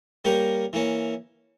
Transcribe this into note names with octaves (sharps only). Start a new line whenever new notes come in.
G3 A#3 C#4 G4 A#4
E3 A#3 C#4